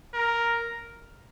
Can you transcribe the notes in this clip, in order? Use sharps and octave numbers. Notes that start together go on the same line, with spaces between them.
A#4